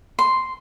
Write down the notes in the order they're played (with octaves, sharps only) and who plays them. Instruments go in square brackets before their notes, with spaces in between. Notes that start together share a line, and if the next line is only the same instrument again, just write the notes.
[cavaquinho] C6